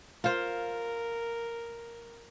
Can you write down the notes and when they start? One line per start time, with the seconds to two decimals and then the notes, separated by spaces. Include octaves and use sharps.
0.24 F4 A#4 C5